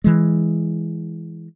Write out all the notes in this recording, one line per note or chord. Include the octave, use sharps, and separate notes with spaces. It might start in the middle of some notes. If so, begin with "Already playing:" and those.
E3 G#3